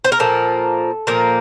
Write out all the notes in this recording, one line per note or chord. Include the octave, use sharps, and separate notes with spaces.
C5
A#4
A#2 F3 A#3 A4
A#2 F3 A#3